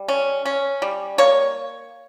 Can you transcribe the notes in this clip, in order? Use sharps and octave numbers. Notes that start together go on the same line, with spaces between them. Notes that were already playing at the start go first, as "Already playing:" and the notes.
Already playing: G3
C#4
C#4
G3
A#3 C#5